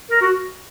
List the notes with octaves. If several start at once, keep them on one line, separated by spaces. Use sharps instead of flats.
A#4
F#4